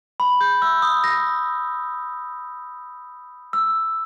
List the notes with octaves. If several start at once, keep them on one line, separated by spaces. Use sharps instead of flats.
B5
G6
E6
D#6
A#6
E6